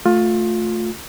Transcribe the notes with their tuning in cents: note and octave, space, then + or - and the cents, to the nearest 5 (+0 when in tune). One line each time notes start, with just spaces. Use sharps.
A3 +0 F4 +20